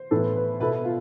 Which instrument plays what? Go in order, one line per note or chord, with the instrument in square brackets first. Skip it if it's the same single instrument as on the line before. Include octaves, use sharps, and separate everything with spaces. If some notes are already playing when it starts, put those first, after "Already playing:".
Already playing: [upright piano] C5
[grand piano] A2 E3 B3 E4 A4 [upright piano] B4
[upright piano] B4
[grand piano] B2 B3 E4 A4 [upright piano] B4
[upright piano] F4